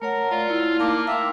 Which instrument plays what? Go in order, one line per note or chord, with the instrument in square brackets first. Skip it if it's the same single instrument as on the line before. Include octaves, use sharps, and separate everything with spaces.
[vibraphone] A3 C#5 F#5 [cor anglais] A#4
[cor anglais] F4 [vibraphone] D5
[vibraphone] A3 E4
[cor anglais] A#3 [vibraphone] D#4 A5 D6
[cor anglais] E5 [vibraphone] F5 G5 C6